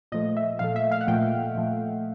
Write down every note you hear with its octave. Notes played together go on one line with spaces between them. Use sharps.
A#2 F3 A3 D#5
E5
A#2 F3 A3 F5
E5
F5
F#5
A#2 F3 A3 G5
A#2 F3 A3